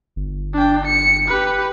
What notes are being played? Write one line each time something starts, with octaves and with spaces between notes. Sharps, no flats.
G1
D4 G5
C#7
G4 B4